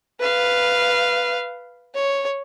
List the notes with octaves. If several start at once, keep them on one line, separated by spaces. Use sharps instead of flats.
B4 F5
C#5